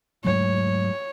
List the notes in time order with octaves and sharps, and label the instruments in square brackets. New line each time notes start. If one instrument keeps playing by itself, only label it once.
[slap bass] G#2 F#3 A3 [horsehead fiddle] C#5